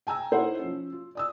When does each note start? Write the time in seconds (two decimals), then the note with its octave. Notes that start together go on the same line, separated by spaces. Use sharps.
0.07 G5 G#5 A#5 E6
0.31 D#4 E4 A4 C5 C#5 F#5
0.59 F3 C#4
0.92 F4
1.15 D5 D#6 E6